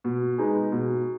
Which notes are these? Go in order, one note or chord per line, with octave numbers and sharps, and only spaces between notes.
B2
G#3 D#4 G#4 B4
B2